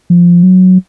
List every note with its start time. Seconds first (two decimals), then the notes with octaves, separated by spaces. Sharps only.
0.10 F3
0.43 F#3